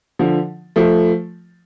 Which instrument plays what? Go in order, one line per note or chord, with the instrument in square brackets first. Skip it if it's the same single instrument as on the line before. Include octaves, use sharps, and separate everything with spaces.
[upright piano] D3 F3
F3 A3